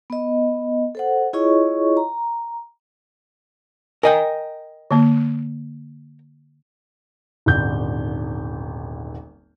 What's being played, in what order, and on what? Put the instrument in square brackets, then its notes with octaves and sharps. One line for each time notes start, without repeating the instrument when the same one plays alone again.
[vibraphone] B3 D#5
A4 C5 F#5
E4 F4 G#4 C#5 D#5 C#6
A#5
[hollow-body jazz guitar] A#4 D#5 G5 [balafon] G#5
[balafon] D3 A#3
[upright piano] D#1 G#1 D3 G6